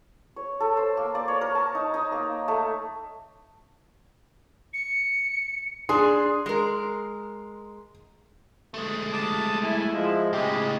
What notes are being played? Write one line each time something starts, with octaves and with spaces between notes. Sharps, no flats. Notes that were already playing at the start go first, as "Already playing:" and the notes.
C#5
A4
C5
A#3
D5
C#5
A#4
A5
D#4
D#4
A#3
A3
C#7
D4 G#4 C6
G#3 A#4
G#3 A3
A5 D6 D#6
E4 G#5
F3 G#3
A2 C#3 G#3 G4